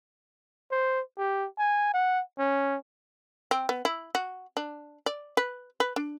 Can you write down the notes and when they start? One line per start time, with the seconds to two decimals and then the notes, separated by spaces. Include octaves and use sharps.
0.71 C5
1.18 G4
1.59 G#5
1.93 F#5
2.38 C#4
3.51 C4
3.69 B3
3.85 E4
4.15 F#4
4.57 D4
5.06 D5
5.37 B4
5.80 B4
5.96 D4